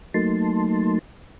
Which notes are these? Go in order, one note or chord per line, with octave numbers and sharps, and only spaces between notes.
F#3 A3 A#3 D#4 A5 C6